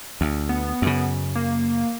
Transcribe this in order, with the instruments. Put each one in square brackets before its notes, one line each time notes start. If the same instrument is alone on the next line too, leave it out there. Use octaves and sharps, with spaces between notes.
[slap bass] D2
[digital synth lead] B3
[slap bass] F#2 C#3
[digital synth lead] A#3